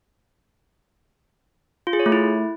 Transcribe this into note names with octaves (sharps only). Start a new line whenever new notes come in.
F4
G#4
C#5
A3
E4